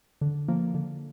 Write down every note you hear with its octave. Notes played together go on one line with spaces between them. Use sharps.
D3
F3 A#3
D3